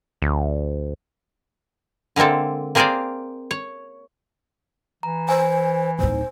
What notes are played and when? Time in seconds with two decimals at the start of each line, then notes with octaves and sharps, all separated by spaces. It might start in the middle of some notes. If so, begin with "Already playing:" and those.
0.22 D2
2.16 D3 G#3 A#3 C4 A4
2.75 A#3 C4 G#4 A#4 C5 D5
3.51 C#5
5.03 E3 A#5
5.29 C5 G#5
5.99 D1 D#4 C5